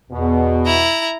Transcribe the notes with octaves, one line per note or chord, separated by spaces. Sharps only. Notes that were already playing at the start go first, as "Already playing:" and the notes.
E2 B2
E4 A#5